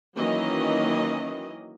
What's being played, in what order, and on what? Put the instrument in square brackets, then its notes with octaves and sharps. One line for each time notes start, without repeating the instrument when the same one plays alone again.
[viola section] D#3 E3 F#3 A#3 C#4 D#5